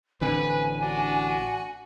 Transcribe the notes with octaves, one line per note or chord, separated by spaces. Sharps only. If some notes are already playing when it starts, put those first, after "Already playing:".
A1 D3 C4 B4 G#5
D4 F#4